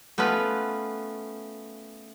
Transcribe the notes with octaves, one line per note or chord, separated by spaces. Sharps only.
A3 B3 C#4 F4 B4